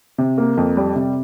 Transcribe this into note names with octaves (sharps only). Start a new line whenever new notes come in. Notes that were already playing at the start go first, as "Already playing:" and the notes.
C3
A#3
F2
G3
C3